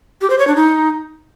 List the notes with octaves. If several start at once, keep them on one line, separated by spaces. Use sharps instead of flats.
G4
C5
C#5
D4
D#4